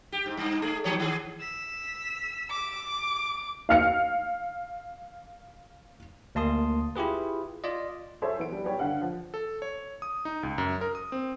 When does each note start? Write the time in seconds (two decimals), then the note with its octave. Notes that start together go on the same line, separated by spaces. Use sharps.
0.12 G4
0.26 G#2
0.37 G2 D#4
0.62 A3 G#4
0.84 D#2 F3 C#5
1.00 D#3 G#4
1.40 E6 B6
2.50 D6
3.69 F5 F6 C#7
6.35 D2 A#3 A5 C6 D#6
6.96 E4 F4 G4 G#4 B4
7.64 F4 D5 D#5
8.22 F#3 G#4 A4 C5 C#5 E5
8.38 E3 B3 D7
8.52 G3
8.64 G3 B3 G4 C#5
8.79 D3 F5 F#5
9.01 F3
9.34 A4
9.62 C#5
10.02 D#6
10.25 D#4
10.43 C#2
10.58 F#2
10.81 A#4
10.95 D#6
11.12 C4